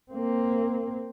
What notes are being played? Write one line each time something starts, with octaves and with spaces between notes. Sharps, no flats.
A#3 C4